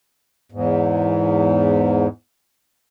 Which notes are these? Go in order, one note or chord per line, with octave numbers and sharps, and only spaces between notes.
E2 G#2